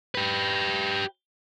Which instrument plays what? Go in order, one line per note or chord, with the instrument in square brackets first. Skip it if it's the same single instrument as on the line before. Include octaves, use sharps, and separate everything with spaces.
[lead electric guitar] G4 B4